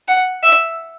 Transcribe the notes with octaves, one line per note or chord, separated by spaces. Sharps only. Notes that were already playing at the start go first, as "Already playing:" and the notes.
F#5
E5